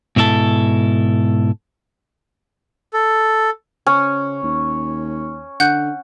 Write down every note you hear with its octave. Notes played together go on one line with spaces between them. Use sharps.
G#2 B2 E4 F#4 A4
A4
C#3 C#4
D#2
D3 F#5 F#6 G6